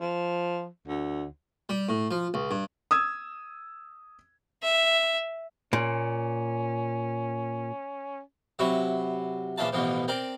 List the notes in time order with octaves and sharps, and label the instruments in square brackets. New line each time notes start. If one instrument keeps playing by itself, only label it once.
[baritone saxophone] F3
D2
[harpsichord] G3
A2
F3
C#2
G2
[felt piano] D#6 E6 G#6
[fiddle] E5
[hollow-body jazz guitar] A#2 [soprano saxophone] C#4
[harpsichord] C3 F#3 E4 C#6
A#1 E3 C#4 F4 E5 A5
A1 B2 E3 F3
C4 A#4 D5